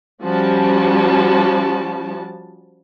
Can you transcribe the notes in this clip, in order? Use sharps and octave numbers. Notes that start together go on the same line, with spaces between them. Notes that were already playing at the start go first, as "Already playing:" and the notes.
F3 G3 C#4 F#4 A5